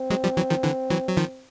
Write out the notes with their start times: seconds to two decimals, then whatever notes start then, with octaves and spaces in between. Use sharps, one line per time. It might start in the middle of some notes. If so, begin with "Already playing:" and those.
Already playing: C4
0.10 F#3 G#3
0.24 F3 G3
0.37 E3 F#3
0.50 D#3 F3
0.63 D3 E3
0.90 E3 F#3
1.08 F#3
1.17 D#3 F3